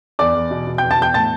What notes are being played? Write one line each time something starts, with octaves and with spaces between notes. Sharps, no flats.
E2 D5 D6
E2
B2
B2
E2 G5 G6
A5 A6
E2 G5 G6
A2 A5 A6